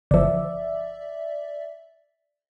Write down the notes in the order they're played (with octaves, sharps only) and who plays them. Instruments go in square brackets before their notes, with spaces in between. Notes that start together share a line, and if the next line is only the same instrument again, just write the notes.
[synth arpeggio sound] G1 F3 [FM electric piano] D5 E5